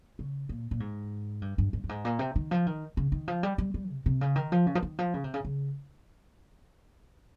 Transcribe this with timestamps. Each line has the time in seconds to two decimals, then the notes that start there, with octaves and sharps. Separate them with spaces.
0.19 C#3
0.49 A#2
0.71 A#2
0.80 G#2
1.42 G2
1.58 G2
1.73 G2
1.84 G2
1.89 G#2
2.05 A#2
2.19 C3
2.36 D#3
2.51 F3
2.67 D#3
2.97 C#3
3.12 D#3
3.28 F3
3.43 G3
3.58 G3
3.74 G3
3.90 C3
4.06 C3
4.21 C#3
4.36 D#3
4.52 F3
4.67 C#3
4.75 F3
4.83 D#3
4.99 F3
5.14 C#3
5.24 C3
5.34 C#3
5.45 C#3